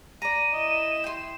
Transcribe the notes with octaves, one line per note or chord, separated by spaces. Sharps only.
D5 A#5 D#7
E4 D#5 E7
G5 C6